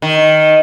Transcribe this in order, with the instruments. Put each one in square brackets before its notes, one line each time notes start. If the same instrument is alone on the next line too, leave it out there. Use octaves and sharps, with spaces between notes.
[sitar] D#3